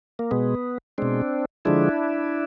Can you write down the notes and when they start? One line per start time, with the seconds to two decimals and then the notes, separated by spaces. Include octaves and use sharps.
0.19 A#3
0.31 B2 G#3 B3
0.98 B2 G#3 C4 D4
1.65 D3 F3 G#3 D4 E4